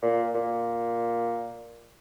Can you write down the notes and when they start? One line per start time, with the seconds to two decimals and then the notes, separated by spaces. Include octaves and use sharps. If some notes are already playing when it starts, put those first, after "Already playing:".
0.02 A#2
0.34 A#2